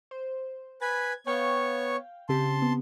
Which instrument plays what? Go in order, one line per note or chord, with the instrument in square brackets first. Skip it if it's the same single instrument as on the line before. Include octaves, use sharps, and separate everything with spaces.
[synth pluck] C5
[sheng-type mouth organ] B4 G#5 B5 [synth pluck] G#6
[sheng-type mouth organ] B3 C#5 C#6 [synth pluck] F5 G5
[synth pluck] C#3 C4 G4 [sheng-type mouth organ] A5 C6
[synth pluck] B3